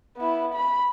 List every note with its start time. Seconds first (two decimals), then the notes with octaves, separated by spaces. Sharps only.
0.17 B3 E4
0.54 B5